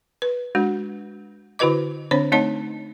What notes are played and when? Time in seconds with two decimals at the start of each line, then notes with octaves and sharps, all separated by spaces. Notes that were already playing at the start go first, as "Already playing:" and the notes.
0.22 B4
0.55 G#3 D4 F#4
1.59 D3 E4 F#4 B4 D#5 D6
2.11 D3 C4 D4 C5 C#5
2.32 A3 C4 D#4 C#5 D#5 A5